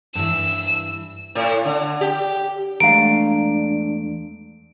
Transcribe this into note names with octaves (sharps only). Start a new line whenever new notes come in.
G2 E3 E6
A2
D3
G4
E2 G#3 A3 D4 F5 A#5 D7